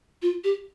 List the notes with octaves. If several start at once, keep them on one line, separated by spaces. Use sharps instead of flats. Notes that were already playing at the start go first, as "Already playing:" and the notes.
F4
G4